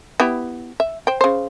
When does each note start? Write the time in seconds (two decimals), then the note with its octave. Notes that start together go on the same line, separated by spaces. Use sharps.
0.20 B3 E4 G4
0.80 E5
1.07 C5 G5
1.21 C#3 C5